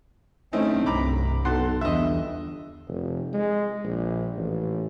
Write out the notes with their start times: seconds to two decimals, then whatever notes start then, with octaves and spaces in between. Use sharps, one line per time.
0.53 D1 A3 C4 C#4 D#4 E4
0.86 C2 G2 A#5 B5 D6
1.45 B1 A4 F#5 C6
1.81 G1 E2 D#5 E5
2.88 F1
3.33 G#3
3.84 A#1
4.38 A1